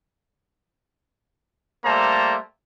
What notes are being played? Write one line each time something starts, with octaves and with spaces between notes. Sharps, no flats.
G3 A3 A#3 A4 C5 A#5